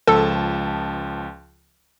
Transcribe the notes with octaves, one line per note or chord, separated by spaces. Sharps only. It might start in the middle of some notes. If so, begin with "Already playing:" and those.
C#2 F3 A4 A5